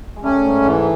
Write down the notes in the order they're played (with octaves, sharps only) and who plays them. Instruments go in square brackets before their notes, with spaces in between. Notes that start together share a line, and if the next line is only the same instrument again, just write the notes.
[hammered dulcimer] G#3
[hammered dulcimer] G3 A3 [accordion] C#4
[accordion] G#2
E3